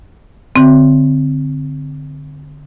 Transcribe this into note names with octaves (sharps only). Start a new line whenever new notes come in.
D3 C4